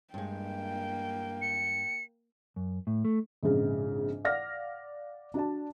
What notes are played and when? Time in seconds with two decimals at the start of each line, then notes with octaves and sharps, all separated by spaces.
0.14 G2 G#3 A#3 G5
1.41 C#7
2.56 F#2
2.87 A2
3.05 A3
3.43 A#1 F2 G#2 C#3
4.25 D5 F5 F#5 F6 A#6
5.34 D4 F#4 D5 A5